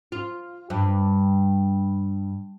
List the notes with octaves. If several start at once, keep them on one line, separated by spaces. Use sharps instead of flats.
F4
G2